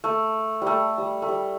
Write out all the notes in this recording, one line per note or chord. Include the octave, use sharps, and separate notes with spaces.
A3
G3 A3
G3
A3
G3